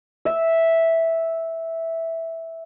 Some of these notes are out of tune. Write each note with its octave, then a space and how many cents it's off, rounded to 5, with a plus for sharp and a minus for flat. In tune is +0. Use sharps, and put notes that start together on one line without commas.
E5 -5